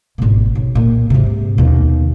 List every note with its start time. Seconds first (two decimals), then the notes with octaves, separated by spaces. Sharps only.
0.18 G#1 B2
0.55 B1
0.75 A#2
1.10 G#2 C3
1.58 D#2 B2